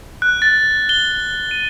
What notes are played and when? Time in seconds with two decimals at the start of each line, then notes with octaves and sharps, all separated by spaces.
0.22 F#6
0.42 A6
0.89 G7
1.51 D#7